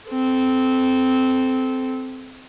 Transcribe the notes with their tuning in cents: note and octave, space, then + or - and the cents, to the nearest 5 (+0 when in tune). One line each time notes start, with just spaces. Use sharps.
C4 -10 A4 -25